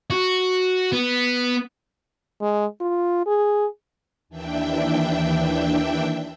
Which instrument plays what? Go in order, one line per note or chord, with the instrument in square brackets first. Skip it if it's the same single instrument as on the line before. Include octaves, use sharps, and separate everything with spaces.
[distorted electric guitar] F#4
B3
[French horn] G#3
F4
G#4
[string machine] D#2 E3 D4 E5 G5